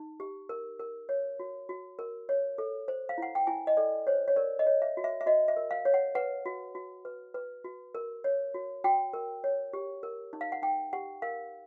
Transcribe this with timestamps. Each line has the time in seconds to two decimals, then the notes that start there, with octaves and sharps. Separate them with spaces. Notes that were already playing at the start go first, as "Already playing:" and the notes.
Already playing: D#4
0.20 G4
0.49 A#4
0.80 A#4
1.09 C#5
1.40 F#4
1.69 F#4
1.99 A#4
2.29 C#5
2.58 A4
2.88 C5
3.09 F5
3.18 E4 F#5
3.35 G5
3.47 E4 G#5
3.67 D#5
3.77 A4 D5
4.07 C5 C#5
4.28 C#5
4.36 A#4 D5
4.59 D#5
4.67 C#5
4.82 E5
4.97 F#4
5.04 E5
5.21 E5
5.26 F#4 D#5
5.48 E5
5.57 A#4
5.71 F5
5.85 C#5
5.94 F#5
6.15 B4 F#5
6.46 F#4
6.75 F#4
7.05 B4
7.34 B4
7.64 F#4
7.95 A#4
8.24 C#5
8.54 F#4
8.84 F#4 G5
9.14 A#4
9.44 C#5
9.73 G4
10.03 A#4
10.33 D#4
10.41 F5
10.52 F#5
10.62 D#4 G5
10.93 G4 F#5
11.22 A#4 F5